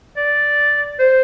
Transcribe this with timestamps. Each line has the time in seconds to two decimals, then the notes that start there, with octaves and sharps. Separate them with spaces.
0.17 D5
0.99 C5